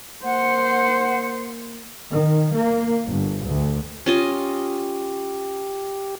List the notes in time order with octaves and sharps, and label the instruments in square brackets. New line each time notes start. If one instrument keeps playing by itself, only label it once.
[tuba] A#3 [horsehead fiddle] C5 [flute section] F#5
[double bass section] D#3
A#3
G1
D2
[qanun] C#4 F4 D#5 [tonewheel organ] G4